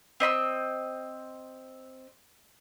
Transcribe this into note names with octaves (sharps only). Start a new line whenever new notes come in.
C4 D#5 B5 E6